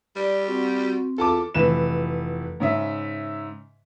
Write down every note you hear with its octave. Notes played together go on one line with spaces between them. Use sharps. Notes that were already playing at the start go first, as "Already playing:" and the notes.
G3 D5
C4 F#4
E2 F4 A4 A5 D6
F1 E3 B4 E7
G#2 C#3 E5